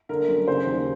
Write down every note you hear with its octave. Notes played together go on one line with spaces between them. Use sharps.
D3 A#4
F#2
C#3 C5
D#2